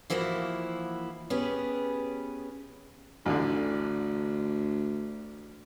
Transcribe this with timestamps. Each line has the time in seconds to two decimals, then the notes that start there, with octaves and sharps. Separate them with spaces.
0.10 E3 F3 A#3 E4 F#4
1.30 B3 C#4 G4 G#4 B4
3.26 A1 D2 D3